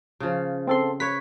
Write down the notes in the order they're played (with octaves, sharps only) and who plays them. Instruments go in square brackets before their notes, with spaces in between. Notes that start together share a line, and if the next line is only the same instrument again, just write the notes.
[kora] C#3 F3
[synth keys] C4 A4 C6
[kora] B4 C#5 [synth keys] B6